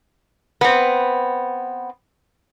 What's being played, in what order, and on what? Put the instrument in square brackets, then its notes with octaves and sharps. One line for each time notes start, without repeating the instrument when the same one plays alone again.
[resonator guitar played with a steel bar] B3 C4